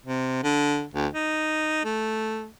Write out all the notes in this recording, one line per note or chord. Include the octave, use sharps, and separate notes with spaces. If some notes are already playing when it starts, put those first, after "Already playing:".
C3
D3
D2
D#4
A3